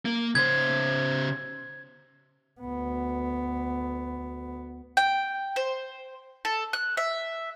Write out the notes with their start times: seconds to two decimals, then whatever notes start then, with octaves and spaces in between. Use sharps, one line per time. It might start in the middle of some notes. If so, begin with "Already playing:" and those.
0.05 A#3
0.35 C#3 C5 G#6
2.61 D2 B3
4.97 G5
5.56 C5
6.45 A4
6.73 F#6
6.97 E5